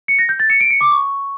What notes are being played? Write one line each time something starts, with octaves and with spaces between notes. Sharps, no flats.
C#7
A#6
G6
A6
C#7
D7
C#7
D6
C#6